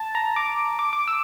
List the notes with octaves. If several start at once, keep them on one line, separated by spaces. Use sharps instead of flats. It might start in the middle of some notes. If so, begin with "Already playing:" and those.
Already playing: A5
A#5
D6
D6
D6
E6